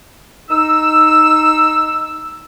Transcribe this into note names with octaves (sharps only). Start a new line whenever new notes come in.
D#4 E6